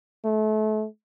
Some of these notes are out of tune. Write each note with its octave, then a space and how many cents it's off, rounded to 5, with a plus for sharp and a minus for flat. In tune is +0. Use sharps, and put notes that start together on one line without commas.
A3 -30